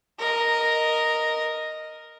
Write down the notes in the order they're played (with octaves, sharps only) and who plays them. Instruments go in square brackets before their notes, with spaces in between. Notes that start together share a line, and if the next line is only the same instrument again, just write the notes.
[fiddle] A#4 D#5